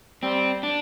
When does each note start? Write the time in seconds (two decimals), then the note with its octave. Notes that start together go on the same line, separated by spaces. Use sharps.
0.23 G3 C4
0.63 D4